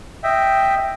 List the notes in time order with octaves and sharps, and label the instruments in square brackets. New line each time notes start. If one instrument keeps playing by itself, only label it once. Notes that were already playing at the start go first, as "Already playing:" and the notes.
[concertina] D#5 E5 G5